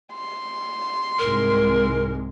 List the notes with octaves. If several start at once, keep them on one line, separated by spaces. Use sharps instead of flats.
C6
C2 G#2 G#3 A#4